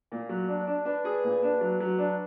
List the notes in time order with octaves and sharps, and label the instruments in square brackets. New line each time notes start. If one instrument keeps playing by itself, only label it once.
[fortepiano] A#2
F#3
D4
[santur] D5
[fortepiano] D4
[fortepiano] D4 [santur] B4
[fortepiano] G#4
A#2
D4
F#3
F#3
D4